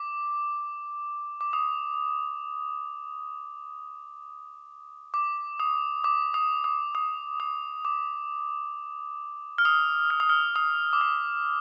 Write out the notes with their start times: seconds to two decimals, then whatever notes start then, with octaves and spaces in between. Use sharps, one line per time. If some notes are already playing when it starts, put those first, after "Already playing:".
Already playing: D6
1.41 D6
1.53 D#6
5.14 D6
5.60 D#6
6.04 D6
6.34 D#6
6.64 D#6
6.95 D#6
7.40 D#6
7.85 D6
9.58 F6
9.65 D#6
10.10 F6
10.20 D#6
10.29 F6
10.56 D#6
10.93 D6
11.01 D#6